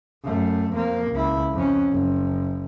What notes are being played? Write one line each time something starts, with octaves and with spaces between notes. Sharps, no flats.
F#2 A3
F2 A#3
C#2 E4
F2 C#4
F#1